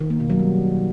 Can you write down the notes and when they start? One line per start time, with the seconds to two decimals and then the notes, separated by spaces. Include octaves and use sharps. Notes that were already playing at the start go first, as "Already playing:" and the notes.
0.01 D#3
0.10 A#3
0.20 B2
0.30 F#3
0.39 G3